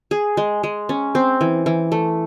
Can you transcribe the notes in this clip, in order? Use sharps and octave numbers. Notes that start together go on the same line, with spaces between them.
G#4
G#3
G#3
C#4
C4
E3
E3
A3